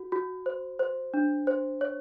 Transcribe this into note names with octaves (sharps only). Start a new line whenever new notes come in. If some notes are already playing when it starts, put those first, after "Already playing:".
Already playing: F#4
F#4
C5
C5
D4
C5
C#5